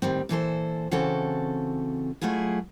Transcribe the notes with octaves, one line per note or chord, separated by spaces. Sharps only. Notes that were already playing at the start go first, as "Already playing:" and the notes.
A2 D#3 G3 C4
A#2 E3 A4 C5
C#3 E3 C4 F#4 A4
F#3 A3 E4 F4 G#4